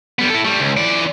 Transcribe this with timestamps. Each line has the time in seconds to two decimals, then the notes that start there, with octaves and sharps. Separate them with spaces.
0.19 G3 B3
0.30 E4 A4
0.45 G3 A3
0.60 C#2
0.77 E3 D5